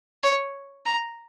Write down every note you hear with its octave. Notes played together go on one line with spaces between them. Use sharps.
C#5
A#5